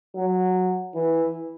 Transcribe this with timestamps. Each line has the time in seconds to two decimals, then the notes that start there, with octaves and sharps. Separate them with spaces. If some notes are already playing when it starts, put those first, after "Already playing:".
0.16 F#3
0.95 E3